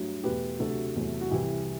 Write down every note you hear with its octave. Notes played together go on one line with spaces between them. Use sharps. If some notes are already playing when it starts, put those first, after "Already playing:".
Already playing: G2 F#3 A3
E2 B2 A3 G4 B4
D2 C3 F#3 A3 F#4 A4
E2 C3 F#3 A3
F#4
C2 C3 E3 G3 E4 G4